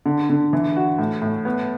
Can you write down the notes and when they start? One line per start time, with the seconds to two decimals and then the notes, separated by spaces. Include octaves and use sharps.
0.06 D3
0.30 D3
0.53 E3
0.76 F#4
0.99 A2
1.22 A2
1.45 B3